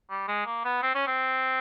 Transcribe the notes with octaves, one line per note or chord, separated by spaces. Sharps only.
G3
G#3
A#3
B3
C4
C#4
C4